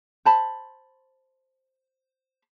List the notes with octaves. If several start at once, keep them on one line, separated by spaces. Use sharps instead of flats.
C5 A5 B5